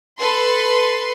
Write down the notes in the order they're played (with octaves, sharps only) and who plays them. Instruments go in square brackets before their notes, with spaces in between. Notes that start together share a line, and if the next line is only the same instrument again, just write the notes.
[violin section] A4 B4 C6